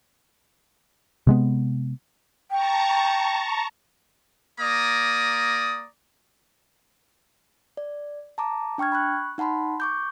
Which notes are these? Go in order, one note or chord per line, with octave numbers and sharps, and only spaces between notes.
C3 G#3 B3
G5 A5 A#5 C#6
A#3 D5 A#5 D#6
D5
A5 A#5 D6
D4 G5 C#6 F6 G#6
B5 C#6 F#6
D#4 F#5 A5 B5 C6
C#6 D6 G6